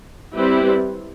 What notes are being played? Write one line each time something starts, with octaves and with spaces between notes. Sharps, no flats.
G3 C4 E4 G4 B4